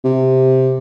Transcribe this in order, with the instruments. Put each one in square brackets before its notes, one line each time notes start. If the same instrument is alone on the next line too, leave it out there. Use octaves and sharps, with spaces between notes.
[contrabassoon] C3